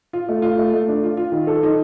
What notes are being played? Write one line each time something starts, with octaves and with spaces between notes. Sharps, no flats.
F4
A3
F4
A3
A3
D4
F4
F4
D#3
A4
D#4